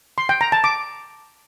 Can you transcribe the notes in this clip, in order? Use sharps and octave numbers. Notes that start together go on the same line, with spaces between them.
C6
G5
A#5
A5
D6